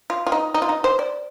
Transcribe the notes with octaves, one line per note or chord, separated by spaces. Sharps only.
F4
F4
D#4
D#4
F4
D#4
C5
D5